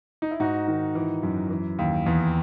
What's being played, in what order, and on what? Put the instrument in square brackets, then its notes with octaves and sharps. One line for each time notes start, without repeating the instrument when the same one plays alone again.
[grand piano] D#4
E4
G#2 D#4 F#4
D#3
E3
F#2
E3
D#2
E2